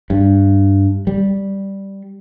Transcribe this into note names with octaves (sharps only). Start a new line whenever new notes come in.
G2
G3